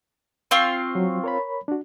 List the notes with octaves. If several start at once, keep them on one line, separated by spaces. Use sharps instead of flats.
C4 F4 C#6
F#3
A#4 C#5 B5
D4 F#4